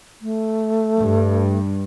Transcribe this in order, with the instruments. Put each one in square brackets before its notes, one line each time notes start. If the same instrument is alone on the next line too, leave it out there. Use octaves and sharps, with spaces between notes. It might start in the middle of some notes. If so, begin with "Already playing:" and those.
[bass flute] A3
[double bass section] G2